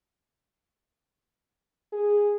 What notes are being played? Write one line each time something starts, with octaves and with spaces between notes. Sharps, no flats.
G#4